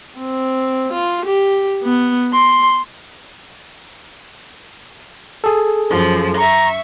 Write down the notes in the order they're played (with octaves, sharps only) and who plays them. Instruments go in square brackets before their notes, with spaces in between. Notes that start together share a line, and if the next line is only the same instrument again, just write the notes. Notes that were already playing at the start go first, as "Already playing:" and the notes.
[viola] C4
F4
G4
B3
C6
[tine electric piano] G#4 A4
[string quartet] F#2 F3
[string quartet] E5 C#6 [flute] A#5